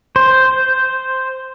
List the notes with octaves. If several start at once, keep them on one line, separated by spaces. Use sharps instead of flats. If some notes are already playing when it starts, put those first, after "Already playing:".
C5